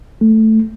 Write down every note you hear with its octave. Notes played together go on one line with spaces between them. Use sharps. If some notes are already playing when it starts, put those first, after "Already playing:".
A3